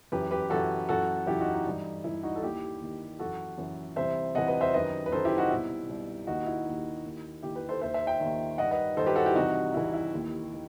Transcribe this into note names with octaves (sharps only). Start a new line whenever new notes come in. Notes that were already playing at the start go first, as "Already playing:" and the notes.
F#2 E3 G4 B4
G4 B4
F#2 E3 F#4 A4
F#2 E3 F#4 A4
F#2 E3 E4 G4
D#4 F#4
D#4
G2 E3
G2 E3 E4
D#4 F#4
A4
D#2 D#3 E4 G4
D#2 D#3
F#2 E3 F#4 A4
F#2 E3
C2 C3 E3 C5 E5
C2 C3 E3 D#5 F#5
B4 D#5
C5 E5
F#2 D#3 B4 D#5
B4
F#2 D#3 A4 C5
E4 G4
D#4 F#4
C2 B2 E4
C2 B2
D#2 D#3 D#4 F#4
E4
D#2 D#3
D#2 D#3
D#2 D#3 E4 G4
G4 B4
A4 C5
D#2 D#3 C5 E5
C5 E5
E5 G5
D#2 D#3
G2 D#3 D#5 F#5
B4 D#5
G2 D#3 A4 C5
G4 B4
F#4 A4
E4 G4
C2 C3 E3 D#4 F#4
C2 C3 E3 E4
E4
D#2 D#3
D#3